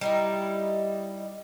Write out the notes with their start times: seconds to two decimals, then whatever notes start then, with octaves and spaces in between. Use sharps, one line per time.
0.01 G3 D#4 E4